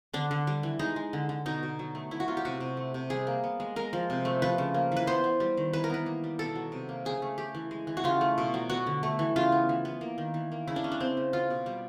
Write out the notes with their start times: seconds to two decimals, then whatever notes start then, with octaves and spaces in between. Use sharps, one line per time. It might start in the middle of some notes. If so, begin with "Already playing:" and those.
0.14 D3 D4
0.31 D3
0.47 G3
0.63 E3
0.79 G#3 D#4
0.96 G#3
1.13 D3
1.29 D3
1.46 B2 D#4
1.63 B2
1.79 F#3
1.95 A3
2.11 B3 E4
2.20 F#4
2.28 F#3 F4
2.37 G4
2.45 C3 F#4
2.60 C3
2.77 A3
2.94 C3
3.10 G3 G#4
3.27 A#3
3.44 B3
3.60 G#3
3.76 G#3 A#4
3.93 F3
4.10 C3
4.25 A3
4.42 F3 B4
4.58 C#3
4.74 A#3
4.92 E3 B4
5.07 B3 C5
5.24 B3
5.40 G3
5.57 D#3
5.73 E3 B4
5.84 A#4
5.90 B3 B4
6.06 A#3
6.24 G3
6.39 B2 A4
6.56 F#3
6.72 C3
6.89 A#3
7.05 C#3 G#4
7.22 A3
7.38 A3 G4
7.55 E3
7.71 G#3
7.87 E3
7.97 F#4
8.04 C#3 F4
8.21 A3
8.38 B2
8.54 F#3
8.70 B3 F#4
8.87 D3
9.03 A3
9.19 E3
9.36 C#3 F4
9.52 B3
9.69 E3
9.85 B3
10.01 A#3
10.18 D#3
10.34 E3
10.52 A#3
10.67 C#3 E4
10.76 D4
10.84 C#3 C#4
10.92 D4
11.00 C#3 C4
11.17 C#3
11.33 B3 F4
11.50 B2
11.66 G3